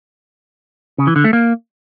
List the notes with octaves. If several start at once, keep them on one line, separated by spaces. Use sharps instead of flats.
C#3
E3
D3
A3
A#3